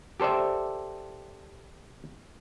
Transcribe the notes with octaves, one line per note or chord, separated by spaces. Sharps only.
G4 A4 C5 D5 E5